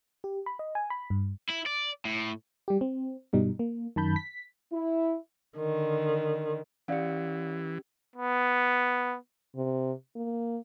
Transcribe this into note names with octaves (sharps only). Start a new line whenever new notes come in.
G4
B5
D#5
G#5
B5
G2
E4
D5
A2
G3 G4
C4
G2 B2 G3 D#4
A#3
F#2 D#3 A5 B5 G6
B6
E4
D3 D#3
E3 C#4 G4 D5 F5 F#5
B3
C3
A#3